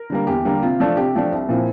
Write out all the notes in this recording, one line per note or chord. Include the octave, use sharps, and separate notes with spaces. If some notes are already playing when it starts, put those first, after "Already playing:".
Already playing: A#4
D3 G3 A#3
E2 G4
D3 G3 A#3
C3 F4
F3 A3 D4
C3 G4
F3 A3 D4
C2
A#2 F3 C4 E4